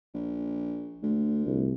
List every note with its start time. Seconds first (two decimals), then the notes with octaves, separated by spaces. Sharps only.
0.14 A#1
1.03 D2 A3
1.46 C2